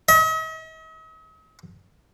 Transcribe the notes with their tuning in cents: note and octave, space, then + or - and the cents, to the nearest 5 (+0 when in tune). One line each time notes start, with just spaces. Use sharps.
D#5 +45